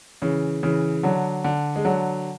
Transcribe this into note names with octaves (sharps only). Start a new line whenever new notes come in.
C#3 E3
C#3 E3
D3 F#3
D3
G#3
D3 F#3